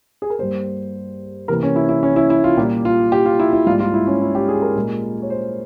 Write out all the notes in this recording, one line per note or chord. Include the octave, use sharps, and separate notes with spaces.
G#4
A#4
G2 G3 A#3 C5
C3 E3 A#3 A#4
C#4
E4
E4
C#4
E4
E4
F4
A#2 G3 A#3 G4
F4
G4
F4
E4
E4
G#2 G3 A#3 F4
F4
E4
C#4
E4
G4
G#4
A#4
A#2 G#3
C#5
C5